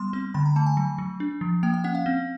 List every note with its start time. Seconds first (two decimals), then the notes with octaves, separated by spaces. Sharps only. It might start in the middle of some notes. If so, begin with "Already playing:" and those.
Already playing: G3 B3 C6
0.13 C4
0.34 D3 B5
0.46 A#5
0.56 A3 A5
0.66 G#5
0.77 F#3
0.98 F#3
1.20 D4
1.41 F3
1.63 A#3 G5
1.74 G5
1.84 C#4 F#5
1.95 F5
2.06 C4